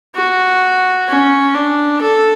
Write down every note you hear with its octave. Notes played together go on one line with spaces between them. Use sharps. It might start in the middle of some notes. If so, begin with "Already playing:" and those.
F#4
C#4
D4
A4